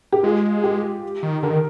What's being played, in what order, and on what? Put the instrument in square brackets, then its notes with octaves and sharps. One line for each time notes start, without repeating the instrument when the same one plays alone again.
[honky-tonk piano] G4
[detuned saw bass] G#3 [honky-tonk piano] F4
[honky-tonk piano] G4
[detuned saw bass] D#3
[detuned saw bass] D3 [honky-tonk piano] A#4
[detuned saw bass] D#3